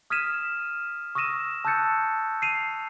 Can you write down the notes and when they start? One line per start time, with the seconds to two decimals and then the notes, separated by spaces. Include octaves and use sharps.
0.10 D#6 F6 G#6 B6 D#7 E7
1.15 C#6 D#6 E6 A#6 D#7 E7
1.65 A5 E6 F#6 G6 A6 C#7
2.42 C7 D#7 F7